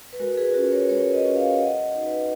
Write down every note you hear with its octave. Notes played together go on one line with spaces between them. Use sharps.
B4
G#3 F#4 A#4
G#4 B4
C#4 F4 F#4 A#4
A#4 C#5
G#3 A#4 C#5
B4 D#5
C#4 F4
C#5 F5
G#3 D#5 F#5
D#4 F#4
B4 D#5